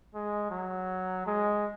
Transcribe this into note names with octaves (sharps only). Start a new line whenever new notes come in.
G#3
F#3
G#3